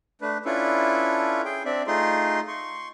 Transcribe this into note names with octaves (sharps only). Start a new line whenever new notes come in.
A3 D4 B4
C#4 D4 E4 F4 A4 B4
G#4 G5
C4 D4 D5 E5
A3 D#4 F4 G#4 C6
C6 C#6